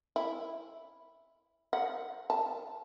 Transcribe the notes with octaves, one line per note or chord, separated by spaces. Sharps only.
E4
F#5
A5